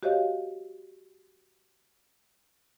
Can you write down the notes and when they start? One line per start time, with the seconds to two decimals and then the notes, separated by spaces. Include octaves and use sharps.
0.03 F#4 G4 C5 C#5 D#5 F5